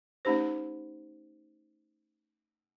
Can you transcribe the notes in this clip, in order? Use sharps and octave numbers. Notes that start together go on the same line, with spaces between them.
A3 C#4 D#4 G4 C5